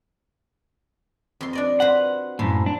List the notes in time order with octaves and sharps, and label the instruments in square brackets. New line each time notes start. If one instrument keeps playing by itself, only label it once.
[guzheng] F2 C6
D4 D5 D#5
[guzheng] F#4 B4 C5 [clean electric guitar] F#5
[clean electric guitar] F#2 A2 [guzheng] F3
[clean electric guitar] D4